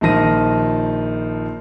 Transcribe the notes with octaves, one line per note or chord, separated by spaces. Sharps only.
A#1 D#3 F3 A#6 D#7